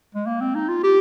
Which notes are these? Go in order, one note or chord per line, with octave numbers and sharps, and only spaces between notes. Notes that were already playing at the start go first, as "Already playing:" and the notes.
G#3
A#3
C4
D#4
F4
G4